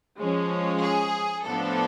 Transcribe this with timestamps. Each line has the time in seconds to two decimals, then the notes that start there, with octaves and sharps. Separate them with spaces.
0.18 F3 G#3 C#4
0.82 G#4
1.45 A2 F3 B3 D4 A4